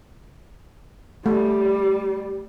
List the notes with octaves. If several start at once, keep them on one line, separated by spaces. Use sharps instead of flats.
G3 A3